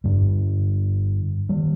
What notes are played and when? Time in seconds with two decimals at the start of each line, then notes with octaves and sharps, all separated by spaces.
0.04 G2 D3 G3
1.49 D#3 G3